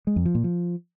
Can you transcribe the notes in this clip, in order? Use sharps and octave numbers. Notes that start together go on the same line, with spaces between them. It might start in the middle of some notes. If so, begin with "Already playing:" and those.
G#3
F2
F3
A#2
F3